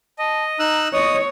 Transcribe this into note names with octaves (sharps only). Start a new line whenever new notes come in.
D#5 A5
D#4 A#5 E6 F#6
C#5 D#5 D#6